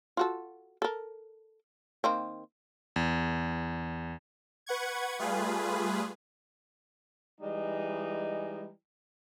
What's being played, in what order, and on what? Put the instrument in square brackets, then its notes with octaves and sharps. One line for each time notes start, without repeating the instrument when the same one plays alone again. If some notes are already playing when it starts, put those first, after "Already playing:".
[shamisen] F4 F#4 A4
A4 A#4
D#3 A#3 C4
[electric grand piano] E2
[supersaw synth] B4 F#5 C#6 G#6
G3 A3 F4 G#4 B4
[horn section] E3 G3 G#3 D#4